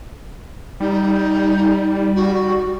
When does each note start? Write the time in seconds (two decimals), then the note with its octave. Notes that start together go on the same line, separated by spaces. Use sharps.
0.80 G3 D#4
2.15 F#4